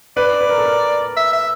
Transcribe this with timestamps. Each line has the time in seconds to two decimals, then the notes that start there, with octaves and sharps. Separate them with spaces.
0.17 B4 D5
0.41 B4
0.49 A#4
0.58 A4
0.66 A#4
1.16 E5
1.33 E5